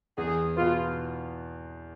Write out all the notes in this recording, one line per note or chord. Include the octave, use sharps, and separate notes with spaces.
E2 G#4
B2 B3 F4